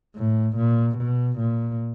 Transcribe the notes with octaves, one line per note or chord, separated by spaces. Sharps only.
A2
A#2
B2
A#2